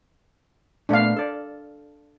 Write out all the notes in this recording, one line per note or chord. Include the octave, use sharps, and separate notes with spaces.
A#2 A3 B3 D4 F5
A4 D5